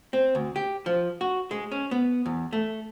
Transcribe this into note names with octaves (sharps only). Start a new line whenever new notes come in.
C4
D2
G4
F3
F#4
G#3
C#4
B3
E2
A3